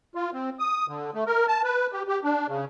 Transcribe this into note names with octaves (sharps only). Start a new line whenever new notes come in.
F4
C4
D#6
D3
A3
A#4
A5
B4
G4
G4
D4
C#3